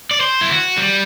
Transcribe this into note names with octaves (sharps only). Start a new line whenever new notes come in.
D5
C5
E4
F#4
G3